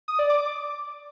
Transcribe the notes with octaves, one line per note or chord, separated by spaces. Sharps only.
D#6
D5
D6